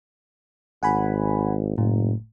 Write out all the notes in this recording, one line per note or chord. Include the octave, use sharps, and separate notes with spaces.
G#1 F#5 G#5 B5
F#1 A2